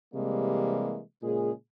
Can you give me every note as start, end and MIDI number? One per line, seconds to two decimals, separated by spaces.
0.14 1.01 48
0.14 1.01 52
0.14 1.01 55
0.14 1.01 56
0.14 1.01 58
1.23 1.52 46
1.23 1.52 49
1.23 1.52 56
1.23 1.52 68